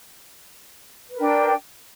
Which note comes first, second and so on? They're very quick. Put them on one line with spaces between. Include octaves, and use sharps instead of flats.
B4 A#4 D4 G5